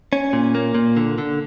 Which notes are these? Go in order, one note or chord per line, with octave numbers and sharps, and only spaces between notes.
C#4
A#2
A#3
A#2
D3
D3